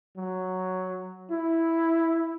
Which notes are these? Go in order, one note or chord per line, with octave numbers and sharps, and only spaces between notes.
F#3
E4